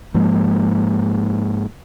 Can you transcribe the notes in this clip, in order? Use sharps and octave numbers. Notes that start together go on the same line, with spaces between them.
G#2 F3 G#3 A#3